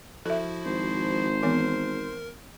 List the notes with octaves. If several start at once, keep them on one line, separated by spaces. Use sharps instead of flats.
F3 E4 F#4 A4 E5
G#1 C5
E3 B3 A#4